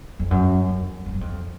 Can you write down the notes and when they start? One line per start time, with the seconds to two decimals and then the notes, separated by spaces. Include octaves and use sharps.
0.19 F2
0.31 F#2
0.69 F2
1.06 F2
1.14 F#2
1.21 F2